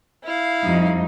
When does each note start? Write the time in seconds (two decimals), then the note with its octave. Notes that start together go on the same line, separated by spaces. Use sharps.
0.24 E4 F5
0.63 F2 G3 D#4